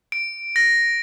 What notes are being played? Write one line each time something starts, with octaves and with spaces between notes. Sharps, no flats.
D7
A#6